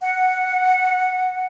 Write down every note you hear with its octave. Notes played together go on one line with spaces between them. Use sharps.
F#5